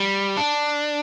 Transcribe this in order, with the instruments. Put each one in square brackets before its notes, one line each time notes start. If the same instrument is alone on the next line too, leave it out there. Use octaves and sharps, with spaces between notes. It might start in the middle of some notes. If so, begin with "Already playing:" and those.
Already playing: [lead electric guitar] G3
D4